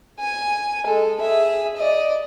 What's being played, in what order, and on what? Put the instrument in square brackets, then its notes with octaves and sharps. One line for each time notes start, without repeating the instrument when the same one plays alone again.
[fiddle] G#5
G#3 A4
G#4 E5
D5 D#5